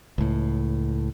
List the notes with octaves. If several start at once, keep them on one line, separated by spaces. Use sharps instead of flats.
C#2 A2